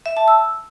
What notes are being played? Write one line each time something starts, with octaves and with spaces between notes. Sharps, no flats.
E5
A5
E6